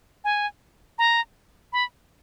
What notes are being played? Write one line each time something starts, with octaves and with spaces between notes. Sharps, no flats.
G#5
A#5
B5